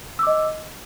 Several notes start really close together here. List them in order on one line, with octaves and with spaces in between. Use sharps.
E6 D6 D#5